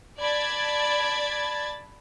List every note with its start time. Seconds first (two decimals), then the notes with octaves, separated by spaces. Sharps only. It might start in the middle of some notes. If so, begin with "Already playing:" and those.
0.21 D5 A5 B5 G#6 A6